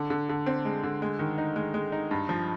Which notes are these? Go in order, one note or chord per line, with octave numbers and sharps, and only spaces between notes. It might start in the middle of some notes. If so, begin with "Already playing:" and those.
Already playing: D3
D3
D3
C4
G#3
D3
G#3
D#3
D#4
G#3
G#3
D#4
G2
F3